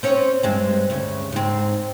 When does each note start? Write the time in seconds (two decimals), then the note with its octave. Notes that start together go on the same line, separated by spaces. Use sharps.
0.03 C4 C#4 C#5
0.43 G2 G#3 C4
0.90 D2 C#3
1.32 G#2 C4